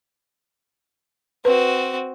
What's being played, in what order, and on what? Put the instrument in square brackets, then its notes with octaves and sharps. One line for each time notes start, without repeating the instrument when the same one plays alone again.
[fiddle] C4 F#4 [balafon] B4